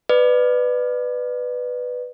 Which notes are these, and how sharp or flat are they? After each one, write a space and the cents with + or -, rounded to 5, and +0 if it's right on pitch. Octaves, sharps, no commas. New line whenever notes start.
B4 +10 D5 +25